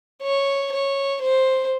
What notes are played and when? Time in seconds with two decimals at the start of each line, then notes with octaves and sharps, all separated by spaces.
0.22 C#5
0.73 C#5
1.23 C5